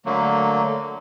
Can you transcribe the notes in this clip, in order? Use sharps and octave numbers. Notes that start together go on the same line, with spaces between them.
D3 F#3 A3 A#3